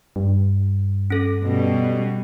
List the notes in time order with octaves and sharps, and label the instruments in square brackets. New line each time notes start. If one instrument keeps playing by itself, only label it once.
[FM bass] G2
[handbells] C#4 A4
[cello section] B2 G3